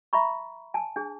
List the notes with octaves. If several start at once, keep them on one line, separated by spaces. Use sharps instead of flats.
E5 A#5 B5 C#6
G#5 A5
D4 G#4